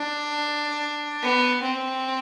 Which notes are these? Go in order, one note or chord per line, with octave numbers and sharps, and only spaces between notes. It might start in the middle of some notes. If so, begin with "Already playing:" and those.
Already playing: D4
B3
C4